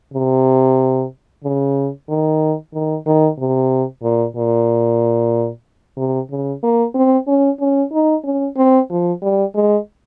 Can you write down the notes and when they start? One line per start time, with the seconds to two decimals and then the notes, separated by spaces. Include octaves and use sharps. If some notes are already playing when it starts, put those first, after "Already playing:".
0.14 C3
1.44 C#3
2.09 D#3
2.73 D#3
3.06 D#3
3.38 C3
4.03 A#2
4.36 A#2
5.97 C3
6.30 C#3
6.63 A#3
6.94 C4
7.27 C#4
7.60 C#4
7.92 D#4
8.24 C#4
8.57 C4
8.90 F3
9.22 G3
9.54 G#3